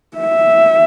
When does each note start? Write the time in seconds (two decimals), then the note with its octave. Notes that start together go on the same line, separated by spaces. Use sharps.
0.17 E5